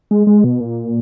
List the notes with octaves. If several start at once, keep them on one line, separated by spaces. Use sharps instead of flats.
G#3
G#3
B2
A#2